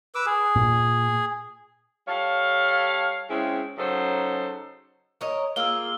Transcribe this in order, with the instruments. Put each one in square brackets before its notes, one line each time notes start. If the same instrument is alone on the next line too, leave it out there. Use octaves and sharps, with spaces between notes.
[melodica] B4 D6 E6
G#4
[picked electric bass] A#2
[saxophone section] G3 A4 C#5 F5
C#3 G#3 C4 C#4 E4 G#4
C#3 F#3 D#4 A4 C5 C#5
[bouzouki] A#4 C#5 D#5
[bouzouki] A#3 F4 G#4 [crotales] E6 F6 G7